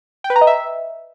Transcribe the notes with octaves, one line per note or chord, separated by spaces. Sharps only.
G5
B4
A#5
D#5
E5